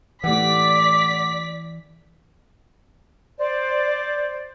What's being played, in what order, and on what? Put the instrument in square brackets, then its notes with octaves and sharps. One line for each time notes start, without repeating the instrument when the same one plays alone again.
[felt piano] A2 G4 F#5 [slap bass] E3 [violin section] D5 B6 [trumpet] D6
[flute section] C5 D5